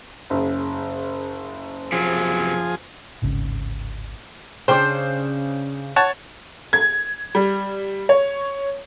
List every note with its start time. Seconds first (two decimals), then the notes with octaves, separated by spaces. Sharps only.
0.30 F#1 C#3
1.92 C3 F3 F#3 G#4
3.22 D1 G#1 C#3
4.68 C#3 D4 C5 G5 C6
5.96 C#5 F#5 A5
6.73 G#6
7.35 G3
8.09 C#5